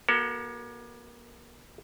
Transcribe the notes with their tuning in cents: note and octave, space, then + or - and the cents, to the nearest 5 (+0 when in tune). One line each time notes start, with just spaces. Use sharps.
A#3 +40 F#4 +15 A4 +25